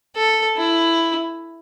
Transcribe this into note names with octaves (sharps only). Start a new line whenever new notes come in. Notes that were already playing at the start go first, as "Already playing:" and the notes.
A4
E4